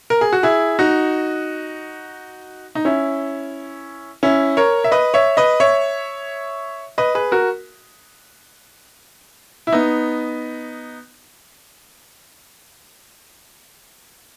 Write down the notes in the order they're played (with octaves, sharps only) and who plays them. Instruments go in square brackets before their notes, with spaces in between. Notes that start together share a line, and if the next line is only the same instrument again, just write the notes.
[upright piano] A#4
G#4
F#4
E4 G#4
D#4 F#4
D#4
C#4 E4
C#4 E4
A#4 C#5
E5
B4 D#5
C#5 E5
B4 D#5
C#5 E5
B4 D#5
G#4 B4
F#4 A#4
E4
B3 D#4